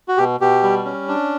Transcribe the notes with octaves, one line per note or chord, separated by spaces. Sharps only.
F#4
B2 G4
B2 G4
G3
C#4
D4